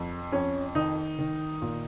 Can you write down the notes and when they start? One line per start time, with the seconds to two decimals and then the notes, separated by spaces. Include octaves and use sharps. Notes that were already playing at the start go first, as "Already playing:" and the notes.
Already playing: F2
0.32 F2 C#4
0.75 D#3 D#4
1.19 D#3
1.62 A#2